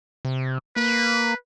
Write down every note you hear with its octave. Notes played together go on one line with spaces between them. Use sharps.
C3
A#3 B4